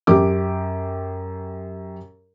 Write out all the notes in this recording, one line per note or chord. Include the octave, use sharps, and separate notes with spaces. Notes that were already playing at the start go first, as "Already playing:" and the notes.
F#2 G4 D6